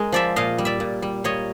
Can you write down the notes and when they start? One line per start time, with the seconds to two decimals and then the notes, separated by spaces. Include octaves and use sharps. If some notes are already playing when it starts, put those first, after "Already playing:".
Already playing: G#3 A#4
0.12 F3 D5 E5
0.36 A#2 D#5 F5
0.58 G3
0.65 D5 E5
0.80 A#2
1.02 G3
1.24 A#2 C#5 D#5